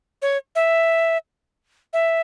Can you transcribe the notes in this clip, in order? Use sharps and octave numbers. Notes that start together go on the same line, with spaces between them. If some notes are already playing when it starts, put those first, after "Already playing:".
C#5
E5
E5